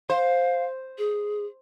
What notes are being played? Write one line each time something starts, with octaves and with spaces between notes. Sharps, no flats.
C5 F5
G#4